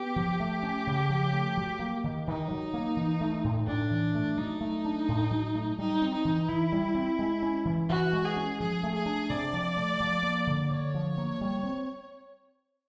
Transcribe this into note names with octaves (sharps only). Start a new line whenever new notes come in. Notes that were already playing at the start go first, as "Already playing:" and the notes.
Already playing: B3 G4
F3
A3
C#4
C#3
F3
A3
F#3
A#3
D#3
D#3 D#4
F#3
A#3
E3
A3
A2
A2 D4
E3
A3
F#3 D#4
A3
D4
A2
F#3
A3
G3 D#4
C4
D#4
E3
E3 E4
G3
C4
G#3
C#4
E3
E3 F#4
G#3
G#4
C#4
F3 G#4
A3
G#4
D4
C3 D5
F3
A3
F3
A#3
D3
D3 C#5
F3
A#3
G3
C4